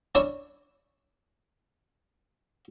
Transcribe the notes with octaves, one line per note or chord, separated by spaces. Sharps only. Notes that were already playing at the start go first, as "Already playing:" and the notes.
C#4 D4 E4 C#5